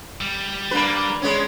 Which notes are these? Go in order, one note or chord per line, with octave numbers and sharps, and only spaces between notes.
G3
A#3 D4 B4
G#3 B3 C#4